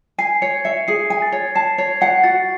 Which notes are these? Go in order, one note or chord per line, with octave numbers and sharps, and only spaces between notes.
G#5 C7
C#5 C#7
E5 C#7
G#4 C7
G#5
A6
C#5
A5 C7
C#5 C7
F#5 C7
F#4 A6